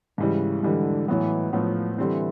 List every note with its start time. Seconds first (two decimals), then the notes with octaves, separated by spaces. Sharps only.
0.18 G#2 C#3 E3 G3
0.63 G#2 D3 E3 G3
1.08 A2 E3 F#3 B3
1.53 A2 F3 F#3 B3
1.98 D3 E3 G3 C4